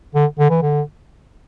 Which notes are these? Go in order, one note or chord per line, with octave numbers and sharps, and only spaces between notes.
D3
D3
E3
D3